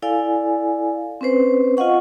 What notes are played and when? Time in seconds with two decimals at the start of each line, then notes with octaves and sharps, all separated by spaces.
0.02 E4 A4 D5 F5 G#5
1.21 C4 C#4 B4 C5
1.77 F4 D#5 F5 F#5 C#6